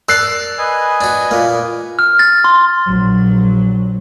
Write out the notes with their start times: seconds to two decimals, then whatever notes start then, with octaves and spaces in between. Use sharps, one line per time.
0.09 A#4 D5 A5 E6 F#6 C7
0.58 B4 D#5 G#5
1.01 D4 F#4
1.31 A#2 A#3
1.99 F6
2.19 A6
2.44 C6
2.88 A#1 F#3